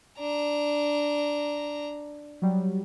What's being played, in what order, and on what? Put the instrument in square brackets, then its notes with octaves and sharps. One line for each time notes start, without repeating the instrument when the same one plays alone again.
[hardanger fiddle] D4 A#5
[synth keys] F#3 G3